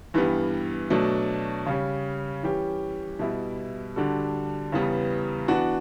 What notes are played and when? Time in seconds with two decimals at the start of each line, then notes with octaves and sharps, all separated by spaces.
0.14 G2 E3 G3 B3
0.90 B2 F#3 A3 D4
1.66 C#3 G3 C#4
2.43 E3 G3 C#4 G4
3.19 B2 G3 B3 E4
3.96 D3 G3 D4 F#4 A4
4.72 E2 C#3 E3 G3 B3
5.48 E3 B3 D4 F#4